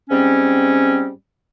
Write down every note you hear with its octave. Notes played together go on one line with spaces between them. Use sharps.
G#2 G3 C4 C#4